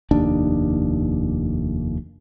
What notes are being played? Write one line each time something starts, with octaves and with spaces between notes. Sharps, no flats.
F1 D#2 D4